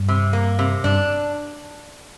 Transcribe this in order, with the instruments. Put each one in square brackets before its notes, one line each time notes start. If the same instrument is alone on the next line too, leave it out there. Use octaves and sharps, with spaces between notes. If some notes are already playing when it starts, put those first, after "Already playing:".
Already playing: [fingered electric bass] G2
[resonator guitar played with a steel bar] C3
A#3
C3
[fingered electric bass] G2 [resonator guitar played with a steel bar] D4